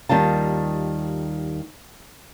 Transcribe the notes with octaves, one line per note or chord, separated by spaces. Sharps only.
D#2 D#3 G3 F4 A5